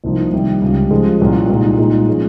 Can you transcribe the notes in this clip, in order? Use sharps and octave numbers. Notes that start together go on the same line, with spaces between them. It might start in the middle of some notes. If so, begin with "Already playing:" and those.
C2 C3 F3 A#3 D#4
C2 C3 D#3 G3
C#2 C#3 G3
C#3 F3 G#3
C2 A#2 G3 C#4
C2 A#2 G#3 D#4
A#2 G#3 D#4
A#2 F3 G#3 C#4